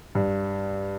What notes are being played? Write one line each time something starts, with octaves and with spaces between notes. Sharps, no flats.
G2